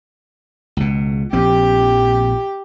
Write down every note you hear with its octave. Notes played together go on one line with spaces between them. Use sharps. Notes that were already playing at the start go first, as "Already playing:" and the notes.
C#2 B2
A#1 F3 C4 G4